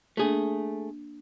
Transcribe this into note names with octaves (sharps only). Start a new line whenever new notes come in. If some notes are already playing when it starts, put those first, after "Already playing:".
A3 A#3 D4 G#4